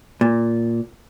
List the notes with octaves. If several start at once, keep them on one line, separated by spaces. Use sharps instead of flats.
A#2